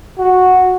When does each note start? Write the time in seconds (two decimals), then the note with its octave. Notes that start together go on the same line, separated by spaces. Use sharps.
0.18 F#4